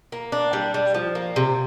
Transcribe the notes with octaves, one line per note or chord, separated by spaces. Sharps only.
A#3
D4
G3
G3
F3
A#3
C3